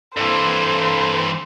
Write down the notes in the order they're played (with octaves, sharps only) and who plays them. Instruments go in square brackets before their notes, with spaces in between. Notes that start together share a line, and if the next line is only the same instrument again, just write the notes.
[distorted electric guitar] G2 E3 [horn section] A#3 C4 A4 [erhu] C5